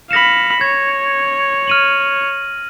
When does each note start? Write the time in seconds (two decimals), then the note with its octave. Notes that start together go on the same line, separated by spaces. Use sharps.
0.11 F5 B5 A#6 C#7 E7
0.61 C#5 G#6
1.67 F6 D#7 F#7